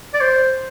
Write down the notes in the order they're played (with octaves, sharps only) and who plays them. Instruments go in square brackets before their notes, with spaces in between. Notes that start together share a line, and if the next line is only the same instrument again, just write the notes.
[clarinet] D5
C5